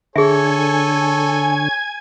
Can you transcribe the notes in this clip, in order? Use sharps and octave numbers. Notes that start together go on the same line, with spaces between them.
D3 G#4 A4 C#5 E5 G#5 G#6